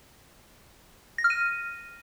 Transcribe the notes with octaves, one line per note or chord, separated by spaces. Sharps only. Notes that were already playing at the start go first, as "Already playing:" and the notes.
A#6
F6
D#7